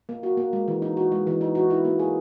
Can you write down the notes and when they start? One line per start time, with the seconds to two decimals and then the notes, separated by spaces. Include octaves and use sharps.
0.09 A#3
0.23 F#4
0.37 A#3
0.53 G#3
0.68 E3
0.82 D#4
0.97 F#4
1.12 G#3
1.27 E3
1.41 D#4
1.55 F#4
1.70 E4
1.85 A#3
1.99 G#4